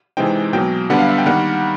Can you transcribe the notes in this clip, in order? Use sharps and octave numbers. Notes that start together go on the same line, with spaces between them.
C3 E3 G#3 C4 D#4 G5
B2 F#3 A#3 G5
D3 G3 B3 D4 F#5
F5
E5
G5
D#3 G3 A#3 F#5